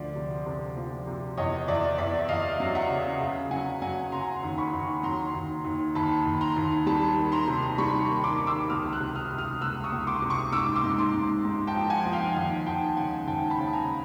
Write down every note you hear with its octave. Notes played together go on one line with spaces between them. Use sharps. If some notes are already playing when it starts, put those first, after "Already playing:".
Already playing: D2 F3 D5
C3
C3
F3
C3
E2 C#5 D#5
E2 D5 E5
E2 D5 E5
E5
E2 D#5 F5
F#3
E5 F#5
C#3
C#3
F#3 F#5 G#5
F#3 F#5 G#5
C#3 A#5 C6
D#2
B5 C#6
D#2
F#3 A#5 C6
D#2
D#2
D#2 A5 B5
D#2
A#5 C6
D#2
G3 A5 B5
D#3
A#5 C6
C3
G3 B5 C#6
D#3
C6 D6
D#3
D6 E6
C#2 D#6 F6
E6 F#6
C3
D#6 F6
C3
D#6 F6
C#2 E6 F#6
C#6 D#6
C#2
C6 D6
C3
C#6 D#6
G#2 D6 E6
C6 D6
G#2
C6 D6
G#2
G#2
G5 A5
F3
F#5 G#5
F3
F5 G5
D#2 F#5 G#5
D#2 G5 A5
C#3 F#5 G#5
D#2 G5 A5
A5 B5
C#3
G#5 A#5